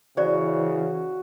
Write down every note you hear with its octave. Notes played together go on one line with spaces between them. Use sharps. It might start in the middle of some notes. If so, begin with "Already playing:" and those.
C#3 E3 F#4 C5 D5